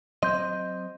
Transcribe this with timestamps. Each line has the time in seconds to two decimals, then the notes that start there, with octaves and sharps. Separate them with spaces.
0.23 F#3 C4 D#5 C6 G6